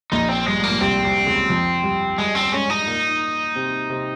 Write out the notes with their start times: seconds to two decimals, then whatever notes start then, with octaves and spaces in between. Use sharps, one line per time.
0.12 A#1 A#2 D#4
0.29 C4
0.46 G2 G#3
0.58 G#2
0.64 A#3
0.70 A#2
0.80 C2 C3 C4
1.04 C2 C3
1.26 C#2 C#3
1.50 F2 F3
1.83 G2 G3
2.18 G2 G3 G#3
2.35 C4
2.53 G#2 G#3 C#4
2.70 D#4
2.87 A#2 A#3
3.55 C3 C4
3.90 C3 C4